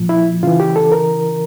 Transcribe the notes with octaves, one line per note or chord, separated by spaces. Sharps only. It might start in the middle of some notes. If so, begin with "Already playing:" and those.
Already playing: A#2 F3
E4
C#3 E3 F4
G4
A4
A#4